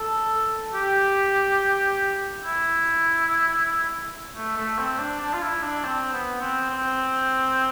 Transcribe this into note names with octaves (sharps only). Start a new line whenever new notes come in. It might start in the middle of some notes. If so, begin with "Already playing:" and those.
Already playing: A4
G4
E4
A3
A3
C4
D4
D4
F4
E4
D4
C4
B3
C4
C4